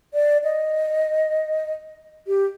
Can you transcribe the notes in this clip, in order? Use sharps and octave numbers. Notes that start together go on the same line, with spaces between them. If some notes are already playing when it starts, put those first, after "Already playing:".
D5
D#5
G4